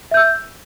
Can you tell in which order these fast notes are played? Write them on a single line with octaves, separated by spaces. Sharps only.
E5 G6 E6